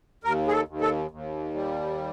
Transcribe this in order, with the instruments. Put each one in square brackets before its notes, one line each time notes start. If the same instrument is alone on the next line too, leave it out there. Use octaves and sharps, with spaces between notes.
[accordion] D#2 A#4
G#4
A4
D#2
A4
D#2
G3